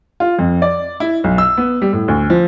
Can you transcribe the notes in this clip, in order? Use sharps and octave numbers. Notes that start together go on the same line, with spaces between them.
F4
F2
D5
E4
B1
E6
B3
G3
A2
D2
F3